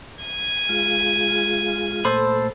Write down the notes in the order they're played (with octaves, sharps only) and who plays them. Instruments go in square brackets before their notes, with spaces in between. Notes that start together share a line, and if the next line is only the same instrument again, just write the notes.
[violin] G#6 D#7
[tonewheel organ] G#3 F4
[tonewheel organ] A#2 A3 [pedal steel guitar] A4 C5 B5